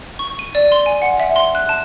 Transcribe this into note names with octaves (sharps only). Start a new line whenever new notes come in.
C#6
D#7
D5
C6
G#5
F#5
E5
C6
F#6
A5